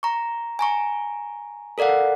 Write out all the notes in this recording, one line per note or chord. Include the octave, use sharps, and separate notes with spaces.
A#5 C#6
G#5 A#5 C#6
A4 A#4 D5 F5 F#5